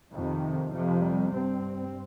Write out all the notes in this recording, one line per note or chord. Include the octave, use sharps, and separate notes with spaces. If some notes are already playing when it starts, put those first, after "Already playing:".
F2 C3 D#3
F2 C3 F3
G3
G2 C4